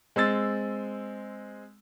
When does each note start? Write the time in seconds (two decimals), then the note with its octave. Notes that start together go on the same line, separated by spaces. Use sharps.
0.16 G#3 C4 E6 A6